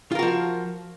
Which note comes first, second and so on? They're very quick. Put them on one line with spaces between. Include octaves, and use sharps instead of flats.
F4 A#4 F#4 F3